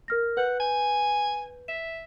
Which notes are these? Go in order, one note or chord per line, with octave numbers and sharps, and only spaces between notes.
A#4 F6 A#6
B4 F#5 G6
G#5
E5 E7